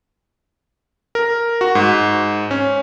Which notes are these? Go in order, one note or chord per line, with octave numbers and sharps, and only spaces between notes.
A#4
F#4
G#2
C#4